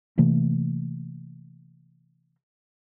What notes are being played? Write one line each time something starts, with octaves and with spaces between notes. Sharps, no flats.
C3 E3 A3 A#3